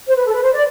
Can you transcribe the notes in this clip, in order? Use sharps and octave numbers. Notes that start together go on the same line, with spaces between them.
C5
B4
A4
B4
C5
D5